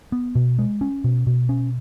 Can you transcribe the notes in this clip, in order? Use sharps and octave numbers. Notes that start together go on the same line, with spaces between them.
B3
B2
G#3
C#4
B2
B2
C#4